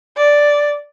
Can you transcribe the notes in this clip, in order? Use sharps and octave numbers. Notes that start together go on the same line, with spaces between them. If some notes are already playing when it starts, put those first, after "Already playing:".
D5